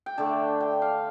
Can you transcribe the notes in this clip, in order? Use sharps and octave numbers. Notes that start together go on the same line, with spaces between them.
G5
D3 A3 D4 A5
G5
F5